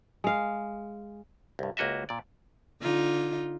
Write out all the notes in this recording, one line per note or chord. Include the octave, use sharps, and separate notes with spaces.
G#3 F5
C2 G2
C#2 A#3 F#4 D#5 E5
A#2 D5
D3 D#4 F4